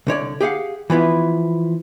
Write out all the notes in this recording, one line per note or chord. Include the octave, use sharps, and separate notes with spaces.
C2 D3 C#5 D5
G4 G#4 F5 F#5
E3 F3 B3 E4